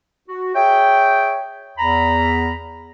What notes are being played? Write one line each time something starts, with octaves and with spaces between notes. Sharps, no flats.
F#4
G#4 C#5 E5 G5
E2 A#5 B5